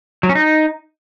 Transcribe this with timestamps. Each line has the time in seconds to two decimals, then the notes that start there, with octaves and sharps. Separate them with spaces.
0.23 F#3
0.29 C#4
0.35 D#4